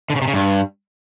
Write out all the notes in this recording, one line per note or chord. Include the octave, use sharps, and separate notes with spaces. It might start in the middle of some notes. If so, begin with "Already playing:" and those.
D3
C#3
C3
C#3
G2